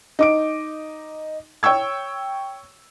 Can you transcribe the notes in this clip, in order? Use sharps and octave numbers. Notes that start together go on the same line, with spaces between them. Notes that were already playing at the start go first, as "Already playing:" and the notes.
D#4 D6 D7
C#5 G5 C#6 E6 G#6